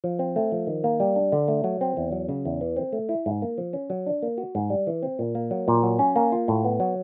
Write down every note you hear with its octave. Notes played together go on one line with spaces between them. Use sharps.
F3
C4
A3
F3
D#3
A#3
G3
D4
D3
A3
F#3
C4
E2
F#3
C#3
E2
E3
C4
A3
E4
G#2
A#3
F3
C#4
F#3
D4
A#3
F#4
G#2
G3
E3
C4
A#2
A#3
F#3
A#2
F#3
C#4
A#3
F4
A2
B3
F#3